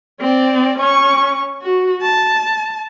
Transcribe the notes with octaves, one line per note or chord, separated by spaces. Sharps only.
C4 D5
C#4 C#6
F#4
A5